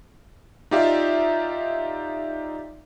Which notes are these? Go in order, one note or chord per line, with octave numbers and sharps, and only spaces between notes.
D#4 F4 G4 D5 E5 F5